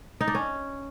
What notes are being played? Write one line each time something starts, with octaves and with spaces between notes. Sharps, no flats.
D#4
D4
C#4